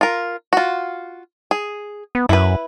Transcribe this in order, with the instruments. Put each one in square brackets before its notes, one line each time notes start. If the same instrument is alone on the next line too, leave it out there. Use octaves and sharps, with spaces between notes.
[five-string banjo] F4 A#4
F4 F#4
G#4
[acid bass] B3
[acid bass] F#2 [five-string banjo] E4 B4